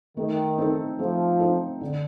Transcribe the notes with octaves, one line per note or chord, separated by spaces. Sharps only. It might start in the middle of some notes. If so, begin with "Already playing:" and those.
D#3 A3
C4 D#4 A4
F3 A3
C4 D#4 A4
D3